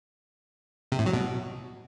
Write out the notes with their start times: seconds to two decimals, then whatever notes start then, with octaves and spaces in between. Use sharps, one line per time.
0.92 C3
0.99 A2
1.06 F#3
1.14 B2